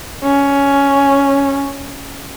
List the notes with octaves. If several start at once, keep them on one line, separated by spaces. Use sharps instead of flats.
C#4